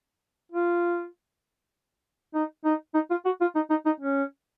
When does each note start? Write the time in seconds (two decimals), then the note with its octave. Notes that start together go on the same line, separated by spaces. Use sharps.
0.52 F4
2.34 D#4
2.65 D#4
2.94 D#4
3.10 F4
3.25 F#4
3.41 F4
3.55 D#4
3.70 D#4
3.86 D#4
4.01 C#4